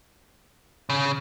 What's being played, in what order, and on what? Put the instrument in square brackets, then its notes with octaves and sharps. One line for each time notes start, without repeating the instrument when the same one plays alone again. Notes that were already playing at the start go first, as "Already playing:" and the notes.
[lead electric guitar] C#3